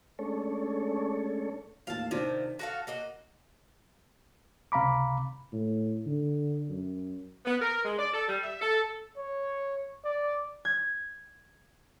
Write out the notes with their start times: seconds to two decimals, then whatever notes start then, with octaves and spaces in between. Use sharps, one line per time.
0.19 G#3 A3 C#4 D4 A4 C#5
1.87 D#2 A2 F3 F5 A5
2.11 C3 D#3 F3 D4
2.59 F#4 A4 F5 A#6
2.87 A#3 F#4 D#5
4.72 C#2 C3 F5 A#5 B5 D6
5.52 A2
6.06 D3
6.69 F#2
7.46 B3
7.61 A#4
7.84 G#3
7.98 D5
8.13 A4
8.28 G3
8.43 E5
8.61 A4
9.17 C#5
10.04 D5
10.65 G#6